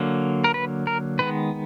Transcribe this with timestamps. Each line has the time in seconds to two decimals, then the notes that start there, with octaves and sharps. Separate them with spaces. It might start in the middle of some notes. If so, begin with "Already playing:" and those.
Already playing: D3 F#3 A#3
0.44 A#4
0.54 B4
0.87 A#4
1.19 D#3 G#3 B3 B4